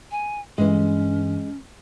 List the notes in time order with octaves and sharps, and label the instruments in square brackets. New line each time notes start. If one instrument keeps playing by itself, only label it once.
[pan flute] G#5
[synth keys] G2 E3 [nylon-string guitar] G#3 [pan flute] C#4